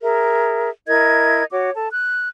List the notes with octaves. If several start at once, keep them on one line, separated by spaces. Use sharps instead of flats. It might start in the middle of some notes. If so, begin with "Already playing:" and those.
G#4 A#4 E5
E4 A#4 D#5 G#6
F#4 C#5 D6
A4 A5
F#6